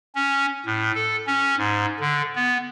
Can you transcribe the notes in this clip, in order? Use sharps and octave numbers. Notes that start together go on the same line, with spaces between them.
C#4
A2
A4
C#4
G#2
D3
B3